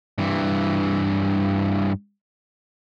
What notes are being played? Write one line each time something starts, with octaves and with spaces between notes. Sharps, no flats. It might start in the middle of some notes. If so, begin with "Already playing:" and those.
G2 E3